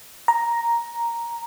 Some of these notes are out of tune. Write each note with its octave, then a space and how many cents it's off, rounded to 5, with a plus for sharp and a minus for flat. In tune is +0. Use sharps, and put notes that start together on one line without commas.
A#5 +5